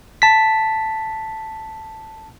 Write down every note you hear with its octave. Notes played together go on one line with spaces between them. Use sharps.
A5 B6